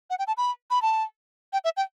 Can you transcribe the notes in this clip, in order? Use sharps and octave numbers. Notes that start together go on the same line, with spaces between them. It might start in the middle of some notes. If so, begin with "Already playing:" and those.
F#5
G5
A5
B5
B5
A5
G5
E5
G5